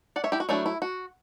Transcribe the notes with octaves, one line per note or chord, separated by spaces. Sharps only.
D5 F#5
C#5 E5
E4 G4
F#4
F#3 A3 D4 E4
E4
F#4